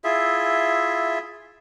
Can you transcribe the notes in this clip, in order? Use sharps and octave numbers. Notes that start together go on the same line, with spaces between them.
E4 F4 G#4 E5